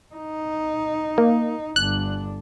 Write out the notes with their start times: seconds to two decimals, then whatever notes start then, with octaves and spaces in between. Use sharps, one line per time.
0.14 D#4
1.18 A#3
1.76 G1 D4 F#6